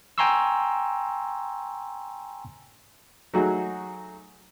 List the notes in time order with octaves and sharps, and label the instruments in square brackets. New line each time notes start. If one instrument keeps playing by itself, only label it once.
[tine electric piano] G5 G#5 A#5 C6 C#6 E6
[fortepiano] F#3 A3 D#4 F#4 G#4